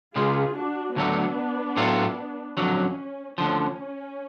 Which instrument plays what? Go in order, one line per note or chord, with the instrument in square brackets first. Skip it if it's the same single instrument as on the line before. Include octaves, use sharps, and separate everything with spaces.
[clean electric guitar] C#2 C#3 G#3 [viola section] F4 G#4
[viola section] D4 F#4
[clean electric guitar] D2 D3 F#3 A3 [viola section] B3 D4
[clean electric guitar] A2 F#3 A3 F4
[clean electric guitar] F2 D3 F#3 [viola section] C#4
[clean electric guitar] D2 D3 F3 [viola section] C#4